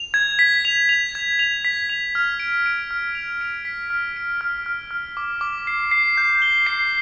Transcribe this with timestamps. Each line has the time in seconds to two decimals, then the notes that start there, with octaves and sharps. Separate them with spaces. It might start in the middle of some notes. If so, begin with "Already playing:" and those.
Already playing: F7
0.14 G#6
0.39 B6
0.65 F7
0.89 F7
1.15 G#6
1.39 F7
1.65 B6
1.89 F7
2.15 F6
2.40 D7
2.66 D7
2.91 F6
3.15 F7
3.41 D7
3.65 B6
3.90 F6
4.16 D7
4.41 F6
4.66 F6
4.91 F6
5.17 D6
5.41 D6
5.67 C7
5.91 C7
6.17 G6
6.42 G7
6.67 C7